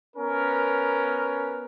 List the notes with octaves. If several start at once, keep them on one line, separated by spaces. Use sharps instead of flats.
B3 C#4 A#4